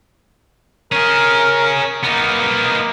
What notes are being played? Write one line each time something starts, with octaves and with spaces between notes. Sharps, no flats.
C#4 G#4 A#4
A#3 B3 D#4